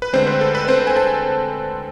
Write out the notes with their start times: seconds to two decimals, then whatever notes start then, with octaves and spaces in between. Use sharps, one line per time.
0.02 B4
0.13 D2 D3 G#3 C4 C5
0.27 B4
0.41 A4
0.55 B4
0.65 B4
0.68 C4 C5
0.87 G#5
0.96 A4 A5